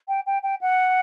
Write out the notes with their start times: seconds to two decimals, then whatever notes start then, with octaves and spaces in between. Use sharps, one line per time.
0.08 G5
0.26 G5
0.43 G5
0.61 F#5